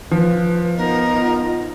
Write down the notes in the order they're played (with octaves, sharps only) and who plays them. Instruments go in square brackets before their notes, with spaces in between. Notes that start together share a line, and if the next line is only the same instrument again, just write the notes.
[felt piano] F3 [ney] B4
[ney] B3 [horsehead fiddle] D#4 F4 [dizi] A#4